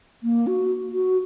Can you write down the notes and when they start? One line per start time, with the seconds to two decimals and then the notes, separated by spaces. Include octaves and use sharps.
0.23 A#3
0.47 F#4
0.93 F#4